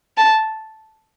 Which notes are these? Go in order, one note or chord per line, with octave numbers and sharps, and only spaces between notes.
A5